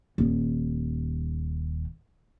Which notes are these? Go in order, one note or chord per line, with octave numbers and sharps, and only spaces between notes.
D#1 D#3